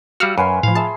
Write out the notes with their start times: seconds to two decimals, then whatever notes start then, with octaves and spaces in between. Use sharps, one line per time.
0.20 G3 F#4 F5 E6 F6
0.38 F#2 B4 G#5 C6
0.63 A2 F3 F5
0.75 G#4 E5 A5 C6